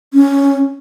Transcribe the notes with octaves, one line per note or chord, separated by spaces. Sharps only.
C#4